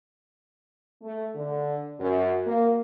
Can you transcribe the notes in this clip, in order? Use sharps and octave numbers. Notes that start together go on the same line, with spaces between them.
A3
D3
F#2
A#3